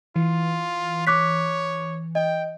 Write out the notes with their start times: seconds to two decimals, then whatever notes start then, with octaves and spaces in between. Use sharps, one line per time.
0.16 E3 F4
1.07 C#5 D6 F#6 B6
2.15 D#5 G5